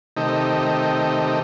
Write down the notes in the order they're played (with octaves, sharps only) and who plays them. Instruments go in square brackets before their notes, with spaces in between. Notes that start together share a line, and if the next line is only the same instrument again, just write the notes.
[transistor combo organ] C3 D#3 A3 D#4 G4